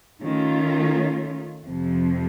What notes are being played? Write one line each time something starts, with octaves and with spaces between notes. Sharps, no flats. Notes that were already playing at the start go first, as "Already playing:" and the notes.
D#3 A3 C#4 F4
F2 C3 F3